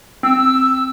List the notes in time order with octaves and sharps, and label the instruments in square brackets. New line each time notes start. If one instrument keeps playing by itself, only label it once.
[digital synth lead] C4 [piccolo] E6